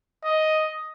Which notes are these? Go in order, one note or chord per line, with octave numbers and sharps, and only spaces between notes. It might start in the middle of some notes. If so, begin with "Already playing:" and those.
D#5